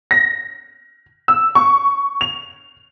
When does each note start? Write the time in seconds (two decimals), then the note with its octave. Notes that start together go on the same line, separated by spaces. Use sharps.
0.11 A#6
1.28 E6
1.55 C#6
2.21 F7